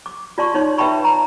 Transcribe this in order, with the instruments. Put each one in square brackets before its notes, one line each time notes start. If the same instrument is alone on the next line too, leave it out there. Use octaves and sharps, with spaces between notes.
[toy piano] D6
F4 D5 A5 C6 C#6
D#4 C#5 C6
B4 E5 G5 A5 B5 C#6
A#5